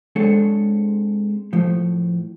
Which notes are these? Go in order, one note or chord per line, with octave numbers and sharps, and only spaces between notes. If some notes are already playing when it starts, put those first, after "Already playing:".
G#3 C4 D4 A4 C#5
A2 F3